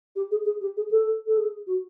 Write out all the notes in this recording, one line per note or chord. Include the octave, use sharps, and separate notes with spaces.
G4
G#4
G#4
G4
G#4
A4
A4
G#4
F#4